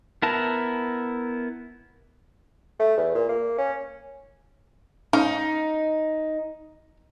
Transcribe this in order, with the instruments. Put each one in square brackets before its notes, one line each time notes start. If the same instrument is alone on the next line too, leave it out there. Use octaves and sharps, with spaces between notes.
[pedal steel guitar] B3 E4 A#4 A5
[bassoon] A3
E2
A#2
A#3
C#4
[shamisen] C#4 F5 [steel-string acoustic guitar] D#4